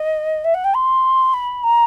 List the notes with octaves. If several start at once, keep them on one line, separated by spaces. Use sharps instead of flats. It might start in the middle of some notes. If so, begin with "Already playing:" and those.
Already playing: D#5
E5
F#5
G5
C6
B5
A#5